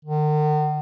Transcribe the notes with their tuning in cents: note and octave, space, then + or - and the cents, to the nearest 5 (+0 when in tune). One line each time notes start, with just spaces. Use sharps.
D#3 -45